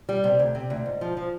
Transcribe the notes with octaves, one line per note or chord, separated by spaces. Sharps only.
G3
C3
D2
C3
D2
G#2
F3
F3